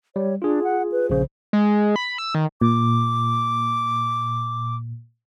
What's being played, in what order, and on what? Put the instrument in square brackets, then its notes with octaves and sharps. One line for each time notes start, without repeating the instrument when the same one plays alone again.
[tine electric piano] G3 [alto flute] C#5
[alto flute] D4 [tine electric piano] F4 G#4
[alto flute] F#5
B4
[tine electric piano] A#1 C#3 [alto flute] C5
[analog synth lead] G#3
B5
E6
D#3
[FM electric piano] A#2 [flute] D6